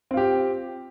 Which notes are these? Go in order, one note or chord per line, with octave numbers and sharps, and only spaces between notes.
C4 F4 G4